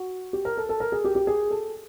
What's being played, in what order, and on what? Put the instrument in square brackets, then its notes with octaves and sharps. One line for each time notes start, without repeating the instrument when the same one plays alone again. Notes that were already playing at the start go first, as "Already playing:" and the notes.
Already playing: [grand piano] F#4
G4
A#4
A4
A4
A#4
G#4
G4
G4
G#4
A4